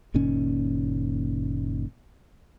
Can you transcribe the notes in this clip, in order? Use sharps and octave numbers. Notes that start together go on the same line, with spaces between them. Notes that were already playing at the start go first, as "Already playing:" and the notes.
F#1 A#2 D#3 C#4